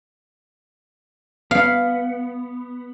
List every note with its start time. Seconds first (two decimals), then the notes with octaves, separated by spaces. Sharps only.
1.51 B3 F5